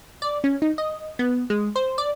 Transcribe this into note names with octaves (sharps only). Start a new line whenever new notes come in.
D5
C#4
D#4
D#5
B3
G#3
C5
D5